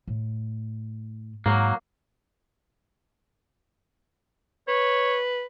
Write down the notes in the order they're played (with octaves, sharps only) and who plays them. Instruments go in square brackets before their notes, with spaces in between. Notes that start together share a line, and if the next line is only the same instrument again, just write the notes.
[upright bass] A2
[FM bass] G#2 [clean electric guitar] F#3 A#3
[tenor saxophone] B4 [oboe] C#5